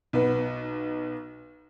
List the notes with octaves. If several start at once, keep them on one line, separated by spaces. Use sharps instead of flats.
B1 B3